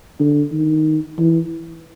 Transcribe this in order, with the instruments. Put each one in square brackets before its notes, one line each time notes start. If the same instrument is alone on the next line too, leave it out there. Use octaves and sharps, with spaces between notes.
[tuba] D3
D#3
E3